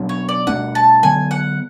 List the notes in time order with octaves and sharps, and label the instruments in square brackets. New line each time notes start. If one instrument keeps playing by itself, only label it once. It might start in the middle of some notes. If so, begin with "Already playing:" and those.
Already playing: [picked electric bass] B2 F#3 B3 D4
[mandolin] C#5
D5
[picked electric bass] B2 A3 D4 [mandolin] F#5
[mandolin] A5
[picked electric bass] D3 F#3 B3 [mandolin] G#5
[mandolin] F#5